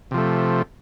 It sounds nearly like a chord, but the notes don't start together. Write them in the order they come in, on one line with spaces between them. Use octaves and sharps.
C3 F3 A3